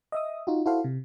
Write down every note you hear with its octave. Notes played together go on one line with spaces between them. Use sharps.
D#5 E5 D#6
D#4 F4 F#4
E4 F#4 A4 C5 F5
C3